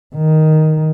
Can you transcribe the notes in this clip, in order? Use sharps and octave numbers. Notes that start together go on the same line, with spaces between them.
D#3